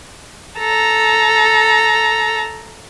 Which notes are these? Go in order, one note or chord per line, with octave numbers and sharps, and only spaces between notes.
A4 A#5